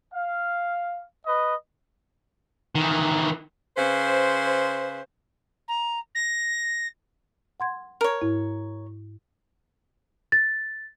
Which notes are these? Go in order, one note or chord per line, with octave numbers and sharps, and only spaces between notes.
F5
B4 D#5
D#3 E3
C#3 B4 C5
A#5
A#6
F#5 C6 G#6
A#4 C#5
G#2 E4
A6